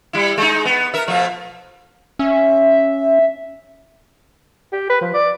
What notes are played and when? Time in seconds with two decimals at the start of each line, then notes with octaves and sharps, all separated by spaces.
0.13 G3 E4
0.38 G#3 D#4
0.65 B3
0.94 A#4 E5
1.08 B2 F3 A3
2.19 C#4 E5
4.73 G4
4.90 B4
5.01 F3
5.14 D5